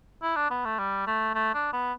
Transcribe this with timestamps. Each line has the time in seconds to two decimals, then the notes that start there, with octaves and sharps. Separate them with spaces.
0.22 E4
0.36 D4
0.50 B3
0.65 A3
0.78 G3
1.07 A3
1.35 A3
1.54 D4
1.73 B3